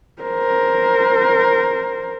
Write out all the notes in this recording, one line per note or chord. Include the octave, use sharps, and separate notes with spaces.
A#4 C5